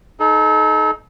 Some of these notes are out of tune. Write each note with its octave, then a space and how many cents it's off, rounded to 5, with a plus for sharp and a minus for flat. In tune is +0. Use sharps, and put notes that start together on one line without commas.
D#4 +0 A4 -35